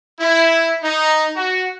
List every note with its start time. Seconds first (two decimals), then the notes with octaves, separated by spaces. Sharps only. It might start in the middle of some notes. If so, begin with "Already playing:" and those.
0.20 E4
0.84 D#4
1.36 F#4